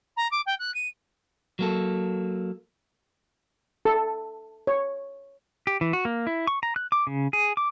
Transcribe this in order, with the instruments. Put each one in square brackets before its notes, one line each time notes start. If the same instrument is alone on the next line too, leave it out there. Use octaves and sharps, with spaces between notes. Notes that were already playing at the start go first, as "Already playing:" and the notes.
[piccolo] A#5
D6
G5
F#6
D#7
[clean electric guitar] F#3 A#3 A4
[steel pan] A4
C#5
[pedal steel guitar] G4
E3
F#4
A#3
E4
C#6
A#5
F#6
D6
C#3
G#4
D6